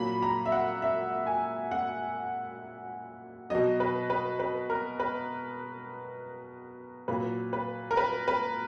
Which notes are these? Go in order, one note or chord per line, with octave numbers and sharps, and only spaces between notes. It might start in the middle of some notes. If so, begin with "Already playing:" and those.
Already playing: A#2 F#3 B5
A#5
E5
F#5
E5
G#5
F#5
B2 F#3 D#5
B4
B4
B4
A#4
B4
A#2 F#3 B4
B4
A#4
B4
B4